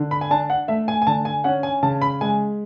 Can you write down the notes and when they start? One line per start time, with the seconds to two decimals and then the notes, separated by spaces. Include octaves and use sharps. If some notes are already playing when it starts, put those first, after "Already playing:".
Already playing: D3
0.11 B5
0.21 G#5
0.31 D4 A5
0.50 F#5
0.68 A3 E5
0.88 G#5
1.02 G#5
1.07 D3 A5
1.25 G#5
1.44 C#4 F#5
1.63 G#5
1.83 C#3 A5
2.02 B5
2.21 G#3 G#5